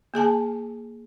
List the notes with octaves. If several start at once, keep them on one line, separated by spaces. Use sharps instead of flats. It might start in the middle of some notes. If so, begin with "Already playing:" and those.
A#3 G#4 G#5 A5